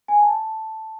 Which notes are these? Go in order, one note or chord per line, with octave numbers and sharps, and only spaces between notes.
G#5
A5